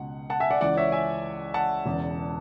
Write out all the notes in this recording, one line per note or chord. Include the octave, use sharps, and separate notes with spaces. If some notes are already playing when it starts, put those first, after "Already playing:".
Already playing: C#2 B2 F#5
F#5 A5
E5 G#5
D5 F#5
C#2 C#3 E3 D5 F#5
C#5 E5
E5 G#5
F#5 A5
E1 E2 C#3